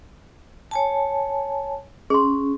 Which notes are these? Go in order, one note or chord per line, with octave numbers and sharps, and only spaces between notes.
C#5 G#5 A5
C#4 G#4 C6